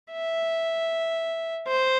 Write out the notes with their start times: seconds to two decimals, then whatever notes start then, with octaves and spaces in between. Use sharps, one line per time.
0.12 E5
1.68 C5